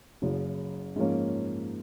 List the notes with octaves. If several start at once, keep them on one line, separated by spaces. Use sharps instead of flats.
F#1 F#2 C#3
G#2 F3 A#3 C#4